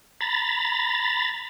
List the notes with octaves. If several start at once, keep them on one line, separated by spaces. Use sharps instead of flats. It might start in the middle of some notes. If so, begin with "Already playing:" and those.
A#5 B5 A6